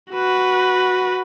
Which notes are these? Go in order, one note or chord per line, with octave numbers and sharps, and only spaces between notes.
F#4 B4